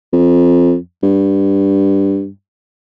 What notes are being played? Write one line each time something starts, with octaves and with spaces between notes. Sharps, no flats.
F2
G2